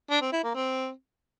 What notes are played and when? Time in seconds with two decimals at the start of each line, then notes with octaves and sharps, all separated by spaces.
0.10 D4
0.21 C4
0.32 E4
0.43 A#3
0.54 C4